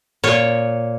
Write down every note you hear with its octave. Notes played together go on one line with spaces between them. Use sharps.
A#2 C#5